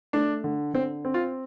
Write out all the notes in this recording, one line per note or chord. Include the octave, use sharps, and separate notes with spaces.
A3 D4
D3
D3 C4
C4
F4